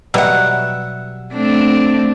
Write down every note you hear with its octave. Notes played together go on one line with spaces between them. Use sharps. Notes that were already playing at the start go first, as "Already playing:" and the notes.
B2 F#3 G3 E5 F#5
A3 C4 D4